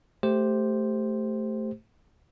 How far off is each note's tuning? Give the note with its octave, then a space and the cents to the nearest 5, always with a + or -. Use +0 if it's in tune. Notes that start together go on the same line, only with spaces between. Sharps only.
A3 +0 G4 +0 C5 +0